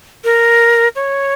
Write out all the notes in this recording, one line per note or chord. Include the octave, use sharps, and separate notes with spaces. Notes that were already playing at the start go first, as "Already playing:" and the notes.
A#4
C#5